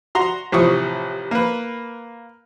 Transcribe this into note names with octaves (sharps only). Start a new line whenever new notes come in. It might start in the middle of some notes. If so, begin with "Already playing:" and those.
F#4 A#5 C6
A1 C3 F3 C#6 D#6
A#3 B4